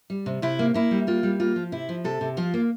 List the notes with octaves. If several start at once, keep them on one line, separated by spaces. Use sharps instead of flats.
G3
C3
C3 E4
A#3
A#3 E4
G3
A#3 F4
G3
A#3 F4
F3
C3 E4
F3
C3 A4
C3
F3 F4
A#3